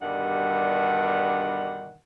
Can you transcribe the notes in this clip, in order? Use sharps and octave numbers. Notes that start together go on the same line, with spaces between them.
G2 B2 D3 D#3 G3 F#5